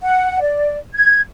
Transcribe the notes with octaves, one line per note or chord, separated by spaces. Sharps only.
F#5
D5
G#6